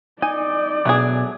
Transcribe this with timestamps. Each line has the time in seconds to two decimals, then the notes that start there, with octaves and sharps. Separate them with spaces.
0.22 D#4 D5 G#5
0.85 B2 F#3 A3 D4 G#4 G#5